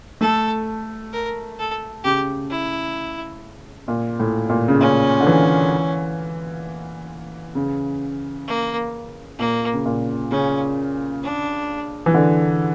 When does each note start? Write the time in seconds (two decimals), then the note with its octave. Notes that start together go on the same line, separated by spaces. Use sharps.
0.21 A3 A4
1.13 A#4
1.59 A4
2.04 C#3 G4
2.50 E4
3.88 A#2
4.19 A2
4.50 A#2
4.68 C#3
4.81 A#2 C#4
5.21 D3
5.27 E3
7.55 C#3
8.47 A#3
9.39 A#2 A#3
9.74 C#3
9.85 A#2
10.31 C#3 C#4
11.23 D4
12.06 E3
12.14 D3